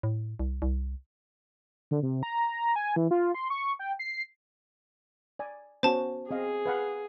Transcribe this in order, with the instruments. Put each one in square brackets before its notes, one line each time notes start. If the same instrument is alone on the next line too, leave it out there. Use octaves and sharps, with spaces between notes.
[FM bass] A2
C2
C2
[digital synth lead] D3
C3
A#5
G#5
E3
F4
C6
C#6
G5
C7
[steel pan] D5 G#5
[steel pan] B3 C#4 F#4 [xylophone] C5 A5
[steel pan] C4 D#5 F5 [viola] G#4
[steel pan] B4 F5 F#5